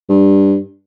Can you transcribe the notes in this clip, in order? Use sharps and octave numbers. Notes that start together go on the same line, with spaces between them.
G2